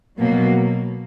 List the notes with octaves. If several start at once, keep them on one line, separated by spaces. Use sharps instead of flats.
B2 F#3 A#3